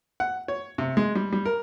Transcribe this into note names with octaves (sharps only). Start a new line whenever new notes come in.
F#5
C#5
C3
G#3
G3
G3
A#4